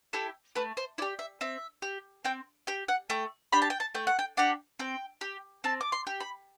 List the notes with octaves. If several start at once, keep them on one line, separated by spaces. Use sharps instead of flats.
E4 G4 A4
A3 B4
C5
E4 D5
G4
E5
C4 E5
G4
C4 G5
G4 G5
F#5
A3 G5
D4 G4 B5
A5
G5
A5
A3 G5
F#5
G5
D4 G4 F#5
C4 G5
G4
C4 A5
D6
C6
G4
B5